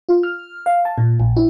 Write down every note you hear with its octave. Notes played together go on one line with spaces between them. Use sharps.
F4
F6
F5
A5
A#2
A#1
E4